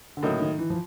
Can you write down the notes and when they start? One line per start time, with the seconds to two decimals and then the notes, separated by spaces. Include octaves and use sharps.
0.17 D3
0.23 A2 C#3 F#3 A#3 D#4
0.41 D#3
0.59 E3
0.70 F3